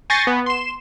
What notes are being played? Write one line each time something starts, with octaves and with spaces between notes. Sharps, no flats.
G#5 C#6 G6 A6 A#6 C7
B3
C6 E7